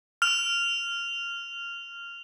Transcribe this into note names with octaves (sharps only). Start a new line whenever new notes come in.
F6 F7